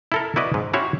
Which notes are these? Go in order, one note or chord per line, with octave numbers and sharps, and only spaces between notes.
E4 A4 A#4
E4 F#4 B4 D5 D#5
G#2
C#4 E4 F#4 G4 C5 C#5